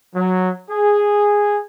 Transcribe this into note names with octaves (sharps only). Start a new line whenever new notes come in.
F#3
G#4